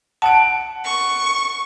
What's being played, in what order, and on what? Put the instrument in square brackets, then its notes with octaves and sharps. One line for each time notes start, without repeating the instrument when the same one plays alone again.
[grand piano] F#5 D7 [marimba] A5
[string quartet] C#6